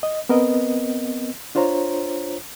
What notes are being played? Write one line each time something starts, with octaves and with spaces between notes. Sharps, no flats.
D#5
B3 C4 A#4 B4 D#5
D4 F4 C5 C#5 A#5